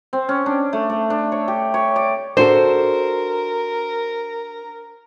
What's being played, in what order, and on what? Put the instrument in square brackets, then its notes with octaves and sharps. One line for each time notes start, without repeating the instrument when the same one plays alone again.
[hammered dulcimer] C4
C#4
D4
A3
A3
D4
C#5
G4
C#5
D5
[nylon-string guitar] D4 F#4 A4 [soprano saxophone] A#4 [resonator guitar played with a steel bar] C5